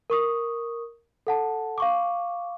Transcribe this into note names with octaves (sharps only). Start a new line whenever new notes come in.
A#4 C#6 D#6
A4 F#5 A5
F5 C#6 D6